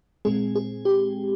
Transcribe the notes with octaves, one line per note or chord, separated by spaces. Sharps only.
A#2 G#3 C4 G#4
G#4
G4